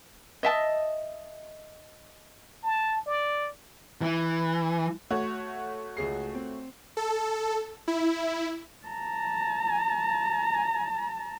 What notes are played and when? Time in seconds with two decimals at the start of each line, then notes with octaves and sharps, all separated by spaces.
0.43 D#5 E5 A5
2.63 A5
3.07 D5
4.02 E3
5.10 A3 F#4 C#5
5.97 C#2 G#4 C7
6.35 C4
6.97 A4
7.88 E4
8.87 A5 A#5